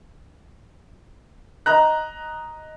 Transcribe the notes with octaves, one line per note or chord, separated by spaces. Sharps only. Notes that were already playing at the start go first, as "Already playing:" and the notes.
D#5 A#5 F#6